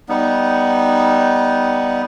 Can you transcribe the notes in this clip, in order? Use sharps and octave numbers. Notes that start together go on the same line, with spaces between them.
G3 B3 D#4